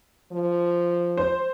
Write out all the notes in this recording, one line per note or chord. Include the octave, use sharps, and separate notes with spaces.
F3
C5